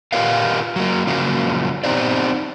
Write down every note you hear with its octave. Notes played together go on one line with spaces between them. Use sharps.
F4 G4 A#4 B4 C#5 F5
F#3 A#3
C#3 F3 F#3 A#3
B3 C4 D#4 G4 C5 D5